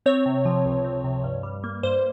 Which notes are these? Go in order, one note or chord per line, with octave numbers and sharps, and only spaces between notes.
C4 C#5
C3
F3
C#2
C4
C3
G2
G3
A#3
G2 C5